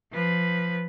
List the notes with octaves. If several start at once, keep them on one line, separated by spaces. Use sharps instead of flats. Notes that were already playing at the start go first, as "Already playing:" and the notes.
F3 B4